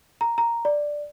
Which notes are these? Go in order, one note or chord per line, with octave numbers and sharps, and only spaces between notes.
A#5
A#5
D5